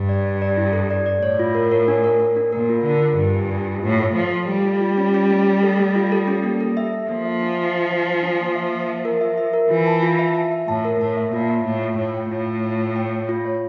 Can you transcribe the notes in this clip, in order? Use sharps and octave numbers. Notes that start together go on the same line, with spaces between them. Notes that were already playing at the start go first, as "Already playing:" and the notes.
Already playing: G2
D5
D5
D5
E4
A4
D5
D5
A2 C#5
F4
A#4
A#4
D4
A#4
A#4
D4
A#2 A#4
F4
D3 A#4
F4
G2 F4
D4
D4
F4
A2 F4
A4
F3 A3
A4
G3 A3
F4
F4
C#4
C#4
A3
A3
A4
A3
F4
A4
C#4
A#3
A4
E5
A4
F3 A#3
E5
D4
E5
D4
D4
D4
D4
A#3
E5
A#3
E5
A#4
E5
E5
A#4
E3 F4
A5
F4
E5
A5
E5
A2 A5
A#4
A2 A5
E5
A#2 F4
E5
A2 F4
C#5
A2 F4
G5
A2 F4
F4
F4
F4
G5
C#5
F4
C#5